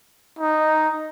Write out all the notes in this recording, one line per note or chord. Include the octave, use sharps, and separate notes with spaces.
D#4